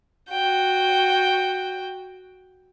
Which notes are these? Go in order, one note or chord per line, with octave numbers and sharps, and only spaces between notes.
F#4 G5